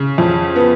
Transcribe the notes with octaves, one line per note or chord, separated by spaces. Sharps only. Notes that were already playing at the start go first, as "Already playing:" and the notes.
Already playing: C#3
F2
B3